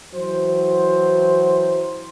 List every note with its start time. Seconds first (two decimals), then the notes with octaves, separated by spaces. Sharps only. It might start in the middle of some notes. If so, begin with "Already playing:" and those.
0.14 E3 F#3 C5